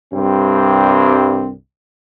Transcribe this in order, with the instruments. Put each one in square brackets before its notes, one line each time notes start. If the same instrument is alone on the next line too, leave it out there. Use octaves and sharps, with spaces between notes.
[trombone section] C2 G2 C4